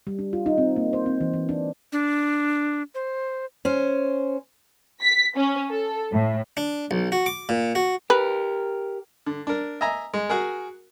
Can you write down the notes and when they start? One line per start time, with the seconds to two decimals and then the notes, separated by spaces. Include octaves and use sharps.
0.07 G3
0.19 D4
0.33 F4
0.46 D#4
0.58 C4
0.76 A#3
0.93 C5
1.06 C4
1.21 E3
1.34 E3
1.49 D4
1.92 D4
2.95 C5
3.65 C#4 C5
5.01 B6
5.36 C#4
5.71 A4
6.12 A2
6.57 D4
6.91 B1
7.12 F#4
7.26 D6
7.49 A#2
7.75 F#4
8.10 G4 A#4 B4
9.26 D3
9.47 D4 A#4
9.81 D#5 E5 G#5 A#5
10.14 G#3
10.29 F#4 G#4 A#4